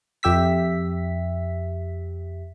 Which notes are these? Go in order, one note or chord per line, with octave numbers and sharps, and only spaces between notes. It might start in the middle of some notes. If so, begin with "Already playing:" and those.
F2 G4 E5 B6